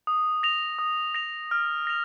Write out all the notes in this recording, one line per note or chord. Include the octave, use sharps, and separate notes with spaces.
D#6
A#6 F7
D#6
A#6 F7
F6
A#6 F7